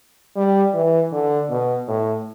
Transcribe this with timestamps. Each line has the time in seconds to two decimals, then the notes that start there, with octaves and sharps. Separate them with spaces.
0.36 G3
0.74 E3
1.12 D3
1.50 B2
1.88 A2